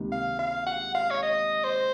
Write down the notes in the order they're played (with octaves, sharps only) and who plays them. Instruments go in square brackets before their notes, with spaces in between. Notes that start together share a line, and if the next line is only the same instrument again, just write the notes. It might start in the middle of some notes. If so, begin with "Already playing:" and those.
Already playing: [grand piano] C#2 C3 D#3 A#3
[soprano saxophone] F5
F5
F#5
F5
C#5
D#5
C5